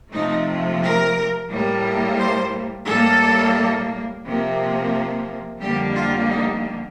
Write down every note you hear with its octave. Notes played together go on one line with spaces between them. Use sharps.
C3 F3 A3 D#4
A#4
A2 G3 A#3
C5
A2 G3 A#3 A4
C3 F3 A#3
F2 D3 G3 A#3 G4
F4
D#4